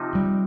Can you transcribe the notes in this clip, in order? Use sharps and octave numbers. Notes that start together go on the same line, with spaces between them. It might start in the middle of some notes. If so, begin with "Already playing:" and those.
Already playing: C3 F3 D#4
G3